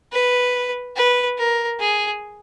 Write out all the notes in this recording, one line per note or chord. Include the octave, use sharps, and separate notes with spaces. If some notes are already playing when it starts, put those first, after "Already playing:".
B4
B4
A#4
G#4